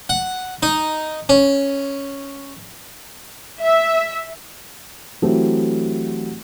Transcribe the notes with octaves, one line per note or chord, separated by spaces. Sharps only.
F#5
D#4
C#4
E5
E3 F#3 A3 C4 G4